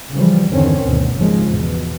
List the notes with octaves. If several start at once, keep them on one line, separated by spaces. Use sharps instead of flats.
C#3 E3 F3 G3
E2 G2 D3 D#3 C4 C#4
D2 G2 B2
G#1 D#2 C#3 F3 G#3
E2 B2